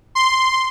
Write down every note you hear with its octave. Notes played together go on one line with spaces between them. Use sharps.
C6